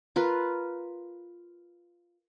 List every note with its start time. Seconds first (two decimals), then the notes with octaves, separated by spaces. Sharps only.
0.16 F4 A#4 B4